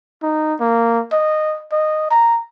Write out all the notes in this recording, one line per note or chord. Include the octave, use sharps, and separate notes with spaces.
D#4
A#3
D#5
D#5
A#5